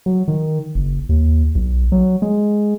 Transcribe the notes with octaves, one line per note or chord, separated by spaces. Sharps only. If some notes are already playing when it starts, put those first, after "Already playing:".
F#3
D#3
F#1
D#2
B1
F#3
G#3